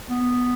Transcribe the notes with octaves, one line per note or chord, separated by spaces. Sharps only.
B3